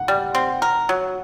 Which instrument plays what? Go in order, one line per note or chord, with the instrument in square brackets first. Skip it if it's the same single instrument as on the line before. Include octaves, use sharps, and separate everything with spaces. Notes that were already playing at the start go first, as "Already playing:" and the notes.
Already playing: [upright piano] F#5
[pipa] G3
C4
A#4
F#3